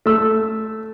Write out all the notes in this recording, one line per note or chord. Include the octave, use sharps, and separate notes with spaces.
A3 E6